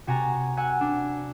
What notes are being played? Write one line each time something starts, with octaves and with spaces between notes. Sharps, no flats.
C3 F#4 G#5 A#5 A6
F#5 G#5 E6 F#6
D4